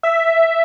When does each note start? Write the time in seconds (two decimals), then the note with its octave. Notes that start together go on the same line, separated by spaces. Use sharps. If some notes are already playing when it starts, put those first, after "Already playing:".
0.03 E5